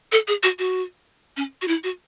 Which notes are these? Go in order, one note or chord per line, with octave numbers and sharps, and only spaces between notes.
A4
G#4
F#4
F#4
C#4
F#4
E4
F#4